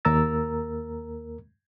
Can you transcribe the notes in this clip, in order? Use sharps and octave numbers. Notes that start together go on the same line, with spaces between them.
D#2 A#3 A#4 A#5 E6 A6